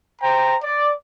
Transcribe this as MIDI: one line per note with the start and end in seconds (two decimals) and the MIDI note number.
0.22 0.56 72
0.22 0.56 79
0.22 0.56 82
0.63 0.93 74